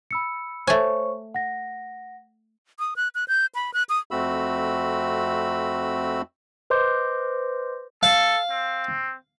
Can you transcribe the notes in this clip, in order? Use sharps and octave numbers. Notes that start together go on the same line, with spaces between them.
B5 E6 C#7
A3 C5 C#5 G#5 C#6
F#5 A#6
D#6
F#6
F#6
G6
B5
F#6
D#6
F2 A3 C4 F#4 B5 E6
B4 C5 D#5 C6 D6 G6
A4 F5
C4